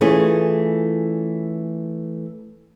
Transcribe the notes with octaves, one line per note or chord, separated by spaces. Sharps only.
E3 A3 C#4 F4 G#4